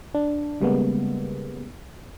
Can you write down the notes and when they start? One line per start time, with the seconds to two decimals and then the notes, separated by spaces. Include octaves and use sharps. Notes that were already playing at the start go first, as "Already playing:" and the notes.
0.15 D4
0.61 C#3 G3 G#3 A#3 B3